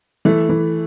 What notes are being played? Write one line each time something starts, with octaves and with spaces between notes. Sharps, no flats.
E3 A3
E3